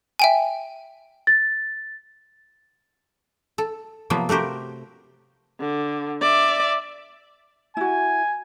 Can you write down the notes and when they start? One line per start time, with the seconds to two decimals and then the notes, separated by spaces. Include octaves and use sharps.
0.19 E5 G5 G#5
1.27 A6
3.58 A4
4.10 C3 F3 F#3 A#3 B3
4.29 A3 F#4 G4 A#4 C5
5.60 D3
6.21 D5 E5
7.77 E4 F#4 G#5